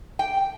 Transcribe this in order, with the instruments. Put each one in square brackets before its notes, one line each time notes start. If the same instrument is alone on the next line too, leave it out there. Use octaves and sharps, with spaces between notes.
[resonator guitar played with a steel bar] G5